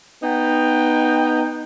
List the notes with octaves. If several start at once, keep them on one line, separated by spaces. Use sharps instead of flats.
B3 D#4 G5